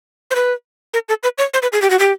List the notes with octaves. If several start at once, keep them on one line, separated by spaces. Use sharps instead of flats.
C5
B4
A#4
A4
B4
C#5
C5
B4
G#4
G4
F#4
G4